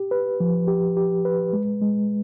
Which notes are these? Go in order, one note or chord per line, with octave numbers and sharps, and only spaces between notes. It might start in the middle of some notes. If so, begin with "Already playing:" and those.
Already playing: G4
B4
F3
G4
G4
B4
G#3
G#3